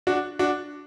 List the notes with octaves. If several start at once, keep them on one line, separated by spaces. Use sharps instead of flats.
D4 F#4
D4 F#4